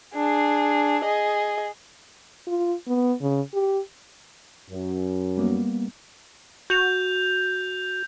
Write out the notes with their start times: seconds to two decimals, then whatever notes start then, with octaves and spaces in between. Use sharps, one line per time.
0.15 D4 G#4
1.04 G#4 D#5
2.47 F4
2.87 B3
3.21 C#3
3.54 G4
4.69 F#2
5.37 G3 A#3 B3
6.70 F#4 G6 F7